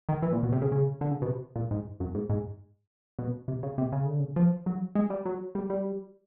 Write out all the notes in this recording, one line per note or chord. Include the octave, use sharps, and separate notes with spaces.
D#3
E3
A#2
B2
C3
C#3
C#3
D3
C#3
B2
C3
A#2
G#2
F#2
G#2
G#2
B2
C3
C#3
C3
C#3
D3
C#3
F3
F#3
G#3
G3
F#3
G3
G3